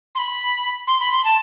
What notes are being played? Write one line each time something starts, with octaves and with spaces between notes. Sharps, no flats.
C6
B5
C6
B5
C6
A5